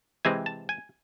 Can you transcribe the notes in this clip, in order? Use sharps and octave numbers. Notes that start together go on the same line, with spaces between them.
C3 E3 G#3 C4 G#5
A5
G#5